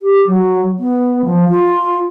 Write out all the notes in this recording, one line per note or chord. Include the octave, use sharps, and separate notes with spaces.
G4
F#3
B3
F3
F4